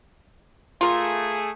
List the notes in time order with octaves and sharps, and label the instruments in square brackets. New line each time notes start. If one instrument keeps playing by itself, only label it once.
[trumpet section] A3 G#4 [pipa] F4 A#4